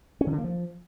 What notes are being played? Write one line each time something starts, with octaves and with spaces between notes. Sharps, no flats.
C#4
D#3
D3
A#3
F3